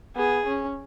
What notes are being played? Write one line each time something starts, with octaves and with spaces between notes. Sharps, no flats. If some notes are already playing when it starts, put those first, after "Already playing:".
B3 G#4
C#4